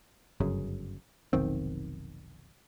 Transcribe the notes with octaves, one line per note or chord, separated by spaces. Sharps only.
G1 F#2 C#3
F1 B1 D#3 C4